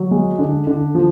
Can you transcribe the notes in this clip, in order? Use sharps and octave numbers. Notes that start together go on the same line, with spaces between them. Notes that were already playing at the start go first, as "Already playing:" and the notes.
Already playing: F#3
G#3
D3
D3
F3